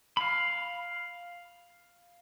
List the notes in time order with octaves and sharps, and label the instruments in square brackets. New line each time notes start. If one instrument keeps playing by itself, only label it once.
[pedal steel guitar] F5 B5